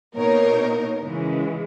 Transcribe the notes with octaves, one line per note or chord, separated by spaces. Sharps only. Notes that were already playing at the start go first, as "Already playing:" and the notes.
B2 A#3 D#4 A#4 C#5
C#3 E3 G#3